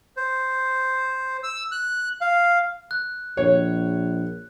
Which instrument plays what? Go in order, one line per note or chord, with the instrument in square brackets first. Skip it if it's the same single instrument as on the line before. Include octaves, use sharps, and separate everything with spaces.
[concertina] C5
E6
F#6
F5
[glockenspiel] F#6
[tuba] A#1 [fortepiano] C#5